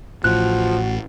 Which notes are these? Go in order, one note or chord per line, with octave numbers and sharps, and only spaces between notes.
A1 A2 F3 F#4 F#6